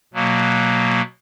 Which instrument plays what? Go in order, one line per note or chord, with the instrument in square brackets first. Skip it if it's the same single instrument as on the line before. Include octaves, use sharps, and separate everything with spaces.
[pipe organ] B2 F#3 A#3